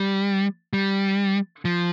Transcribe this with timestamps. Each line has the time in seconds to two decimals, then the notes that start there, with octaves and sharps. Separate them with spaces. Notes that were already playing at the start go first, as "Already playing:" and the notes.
Already playing: G3
0.73 G3
1.65 F3